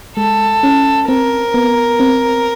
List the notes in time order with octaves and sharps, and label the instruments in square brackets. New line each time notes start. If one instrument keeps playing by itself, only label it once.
[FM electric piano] G#3 [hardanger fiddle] A4
[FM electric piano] C#4
[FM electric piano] C4 [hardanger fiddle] A#4
[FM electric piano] B3
C4